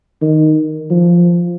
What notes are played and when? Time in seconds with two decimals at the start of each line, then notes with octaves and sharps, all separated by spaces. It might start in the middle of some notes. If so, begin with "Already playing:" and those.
0.22 D#3
0.90 F3